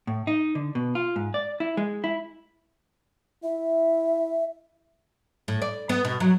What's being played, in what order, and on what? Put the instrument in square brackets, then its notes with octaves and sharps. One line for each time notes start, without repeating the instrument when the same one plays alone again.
[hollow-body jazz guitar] A2
D#4
D3
B2
F4
G#2
D5
E4
G#3
E4
[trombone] E4 [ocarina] E5
[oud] A2
D5
B3
B2
F#3